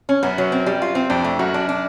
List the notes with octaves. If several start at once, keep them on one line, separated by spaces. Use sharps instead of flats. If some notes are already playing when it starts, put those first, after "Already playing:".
C#4
F#2 B3
F#3
C4
G3
F4
C4
F2 D4
A3
F#2 F#4
D4
D4